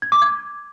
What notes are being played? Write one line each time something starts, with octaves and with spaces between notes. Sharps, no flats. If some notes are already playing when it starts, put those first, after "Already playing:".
G#6
D6
G#6